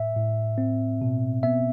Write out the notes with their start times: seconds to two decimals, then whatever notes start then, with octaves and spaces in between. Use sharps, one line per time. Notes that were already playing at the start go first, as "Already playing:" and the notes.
Already playing: A2 E5
0.16 A2
0.58 C4
1.01 B2
1.43 B3 E5